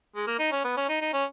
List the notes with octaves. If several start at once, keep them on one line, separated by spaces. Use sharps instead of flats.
G#3
A#3
D#4
C#4
B3
C#4
D#4
D#4
C#4